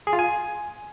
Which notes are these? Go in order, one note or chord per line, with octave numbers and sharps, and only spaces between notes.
G#4
F4
G#5